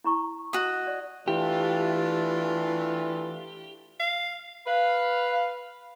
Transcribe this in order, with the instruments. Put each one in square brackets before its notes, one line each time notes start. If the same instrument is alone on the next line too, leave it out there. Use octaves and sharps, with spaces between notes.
[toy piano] E4 A#5 C#6
[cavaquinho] F#4 D#5
[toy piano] D5
[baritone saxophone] E3 [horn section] A3 D4 F4 [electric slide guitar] G4
[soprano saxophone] F5
[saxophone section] B4 F5